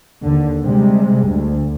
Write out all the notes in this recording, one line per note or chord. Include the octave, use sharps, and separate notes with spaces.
D#2 D3
C3 G3 G#3
D2